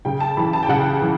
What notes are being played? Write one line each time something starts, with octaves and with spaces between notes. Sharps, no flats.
C#3 G5
A5
E3 B5
A5
G5
C#3 F#5
E3